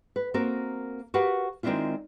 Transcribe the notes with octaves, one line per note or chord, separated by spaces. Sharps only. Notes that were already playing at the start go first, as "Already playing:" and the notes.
B4
A#3 C4 F#4 A#4
F#4 G4 A#4 B4 F5 F#5
D#3 G#3 C4 D4 E4 F4